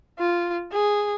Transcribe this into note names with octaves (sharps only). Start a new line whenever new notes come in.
F4
G#4